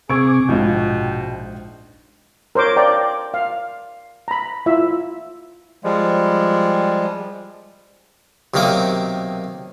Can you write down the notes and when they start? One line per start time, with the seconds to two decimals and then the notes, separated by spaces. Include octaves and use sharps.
0.10 C3 C4 G#4 C#6 D6 E6 G#6
0.49 A#1 G#2 B2 F4 G5
2.55 A#4 C5 C#5 D6
2.76 D5 F5 G5 A#5
3.34 F5
4.28 A#5 B5
4.66 E4 F4 E5
5.84 F3 G3 G#3
8.54 B1 C3 D#3 A#3 D6